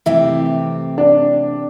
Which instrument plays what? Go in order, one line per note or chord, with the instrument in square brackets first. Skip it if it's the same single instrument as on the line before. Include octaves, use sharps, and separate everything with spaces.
[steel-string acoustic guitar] C3 E3 A3 C4 G4 [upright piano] E4
[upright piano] D4